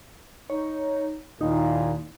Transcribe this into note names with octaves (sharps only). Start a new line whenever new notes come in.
D#4 C#5
D#2 A#2 D#4 E4